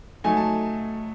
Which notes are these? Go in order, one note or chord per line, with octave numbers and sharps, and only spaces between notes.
F#3 A3 D#4 G#5
A5